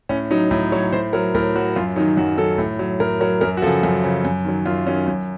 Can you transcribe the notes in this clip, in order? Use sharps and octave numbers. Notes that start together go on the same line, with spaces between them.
A2 C#4
F#3 D#4
A2 D#4
F#3 C#5
A2 C5
F#3 A#4
A2 A#4
F#3 F#4
F#2 F4
D#3 F#3 D#4
F#2 F#4
D#3 F#3 A4
A2
F#3
A2 A#4
F#3 A#4
F#2 A#4
F#4
C#3 F3 A4
F#2
C#3 F3
F#2
D#3 F#3
F#2 F4
D#3 F#3 C#4
F#2